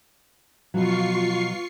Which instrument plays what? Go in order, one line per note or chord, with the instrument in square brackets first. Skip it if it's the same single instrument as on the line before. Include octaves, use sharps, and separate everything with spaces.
[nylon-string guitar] B2 F3 F#3 [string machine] F4 C#6 C7